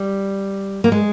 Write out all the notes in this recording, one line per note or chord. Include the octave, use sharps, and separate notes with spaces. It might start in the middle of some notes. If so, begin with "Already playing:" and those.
Already playing: G3
A#3
G#3